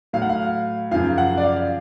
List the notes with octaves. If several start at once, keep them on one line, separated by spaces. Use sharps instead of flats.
A2 F#3 F5
F#5
F5
F#2 C#3 F3 F5
F#5
D5
F5